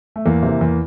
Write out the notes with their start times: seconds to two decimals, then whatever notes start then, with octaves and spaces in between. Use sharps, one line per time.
0.16 A3
0.26 E2 A#3
0.43 C3
0.48 E3
0.61 E2